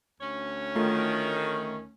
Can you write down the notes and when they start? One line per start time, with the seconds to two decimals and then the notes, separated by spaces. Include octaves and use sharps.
0.20 D2 C#4 C#5
0.76 D#3 A3 F4